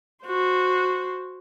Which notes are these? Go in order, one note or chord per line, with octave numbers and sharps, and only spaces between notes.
F#4 C5